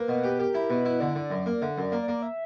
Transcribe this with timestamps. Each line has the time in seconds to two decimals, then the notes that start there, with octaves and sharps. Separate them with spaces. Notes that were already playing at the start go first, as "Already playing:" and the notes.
Already playing: A#3 B4
0.08 B2
0.24 G4
0.39 G4 A#4
0.55 E4
0.70 B2 B4
0.85 E4
1.00 D3 D5
1.15 D3
1.30 F#2
1.46 A#3
1.62 D3 E5
1.78 F#2 D5
1.92 A#3
2.02 D5
2.08 A#3
2.22 E5